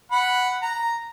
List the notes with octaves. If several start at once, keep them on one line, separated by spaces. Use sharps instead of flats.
F#5 B5
A#5